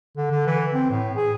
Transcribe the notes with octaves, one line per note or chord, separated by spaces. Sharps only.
D3
D3
E3
C4
A2
G#4